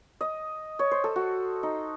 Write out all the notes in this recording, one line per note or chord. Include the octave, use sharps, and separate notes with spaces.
D#5
C#5
C5
A4
F#4
D#4